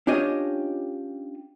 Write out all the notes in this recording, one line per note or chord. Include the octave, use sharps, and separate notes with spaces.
C#4 D4 F4 G4 C#5 D#5